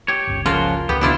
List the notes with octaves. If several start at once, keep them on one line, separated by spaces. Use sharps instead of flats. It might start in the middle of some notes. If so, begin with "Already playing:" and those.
G4 C#5
G1 C#2
C#3 F3 A#3 F4 F#4
C#2 B3 G4
B2 D4 E4 F4